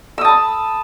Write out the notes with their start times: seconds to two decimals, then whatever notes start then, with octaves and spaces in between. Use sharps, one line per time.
0.18 E6
0.21 D#6
0.25 A5
0.28 B5